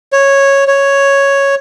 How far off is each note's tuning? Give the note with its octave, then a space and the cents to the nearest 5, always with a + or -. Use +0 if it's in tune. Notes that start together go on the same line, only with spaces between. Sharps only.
C#5 -5
C#5 +0